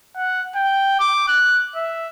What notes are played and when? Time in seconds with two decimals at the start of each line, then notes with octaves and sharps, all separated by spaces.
0.17 F#5
0.56 G5
1.00 D6
1.28 F#6
1.76 E5